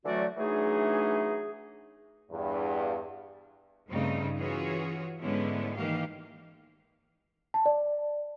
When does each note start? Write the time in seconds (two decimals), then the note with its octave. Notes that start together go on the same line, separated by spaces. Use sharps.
0.05 D3 E3 F#3 A3 F#4 D5
0.37 E3 F#3 A3 D4 D#4 G#4
2.31 E2 G2
3.89 G2 C#3 A3 C4 D#4
4.37 E3 C#4 F4 F#4 G#4 C#5
5.21 G#2 D3 G#3 B3 C#4 E4
5.75 D#3 E3 A#3 G4 F5
7.54 A5
7.66 D5